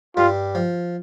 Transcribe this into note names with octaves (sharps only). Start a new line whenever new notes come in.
G2 G3 F4
F3